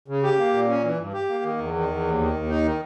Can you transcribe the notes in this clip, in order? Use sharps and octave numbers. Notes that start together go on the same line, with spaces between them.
C#3
G4
A#3
A#2
C#4
E3
G2
G4
A#3
D#3
E2
D#3
E2
D#2
D#3
D#2
D#4
D#3